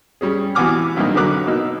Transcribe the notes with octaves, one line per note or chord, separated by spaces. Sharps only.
G3 C#4 G#4
E3 B3 F#4 G#5 D6 F6
B1 G2 C3 A#3 D#4
D3 F#3 A#4 B4 D6 F#6
B2 A#3 D#4 E6